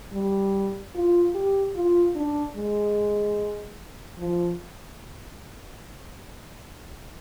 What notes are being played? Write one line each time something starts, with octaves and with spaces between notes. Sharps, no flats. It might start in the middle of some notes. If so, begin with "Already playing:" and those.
G3
F4
G4
F4
D4
G#3
F3